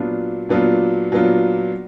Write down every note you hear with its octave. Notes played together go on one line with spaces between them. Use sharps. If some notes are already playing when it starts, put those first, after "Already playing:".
Already playing: A#2 F#3 B3 D4 F4
A#2 F#3 B3 D4 F4
A#2 F#3 B3 D4 F4